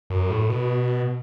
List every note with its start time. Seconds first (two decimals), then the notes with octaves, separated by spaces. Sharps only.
0.10 F#2
0.30 A2
0.49 B2